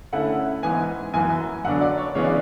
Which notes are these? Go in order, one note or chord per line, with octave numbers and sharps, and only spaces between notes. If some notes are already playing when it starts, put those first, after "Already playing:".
D3 A3 C#4 E4 F#5
G#2 E3 B3 G#5
F#2 E3 B3 G#5
F#2 D3 F#3 B3 D4 F#5
D5
C#5
C#3 E3 G#3 B3 C#5
D5